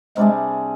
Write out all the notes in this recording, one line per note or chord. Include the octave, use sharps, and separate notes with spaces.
C3 G3 G#3 D4 G#4